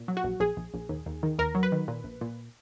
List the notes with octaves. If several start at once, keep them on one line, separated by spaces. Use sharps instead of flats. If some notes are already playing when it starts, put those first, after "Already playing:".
Already playing: A#2
F#3
F#4
A#1
A#1 G#4
A#1
A#1
D#2
D#2
D#3
D#2 A#4
F#3
B4
D#3
A#2
A#1
A#2